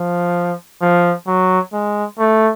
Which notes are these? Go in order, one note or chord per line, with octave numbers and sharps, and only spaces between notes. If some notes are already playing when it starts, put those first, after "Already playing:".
Already playing: F3
F3
F#3
G#3
A3